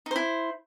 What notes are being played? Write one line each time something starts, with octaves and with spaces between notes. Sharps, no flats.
D#4 E4 C5